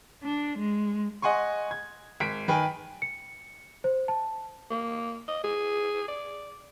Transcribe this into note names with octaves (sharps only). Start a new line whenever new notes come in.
D4
G#3
D#5 F#5 G#5 C6 C#6
G#6
G#1 B6 D7
D#3 B4 G5 G#5
C#7
C5
A5
A#3
D#5
G#4
D5